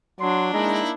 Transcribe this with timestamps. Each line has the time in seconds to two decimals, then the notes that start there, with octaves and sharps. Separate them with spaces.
0.20 F#3 D4 C6
0.53 G#3 A#3 D#4 E4 A#5